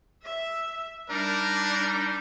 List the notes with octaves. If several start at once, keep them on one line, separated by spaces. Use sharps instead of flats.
E5
G3 D4 D#4 A#4